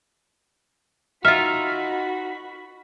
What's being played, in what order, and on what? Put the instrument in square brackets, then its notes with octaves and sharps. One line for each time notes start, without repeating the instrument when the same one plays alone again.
[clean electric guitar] D#4 [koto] F4 E5 [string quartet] F#4 B5 [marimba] F6